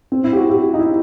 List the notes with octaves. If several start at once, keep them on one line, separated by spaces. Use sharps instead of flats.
C4
E4
G4
F#4
G4
D#4
E4